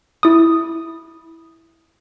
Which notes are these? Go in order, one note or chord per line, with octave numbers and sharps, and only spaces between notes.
E4 D#6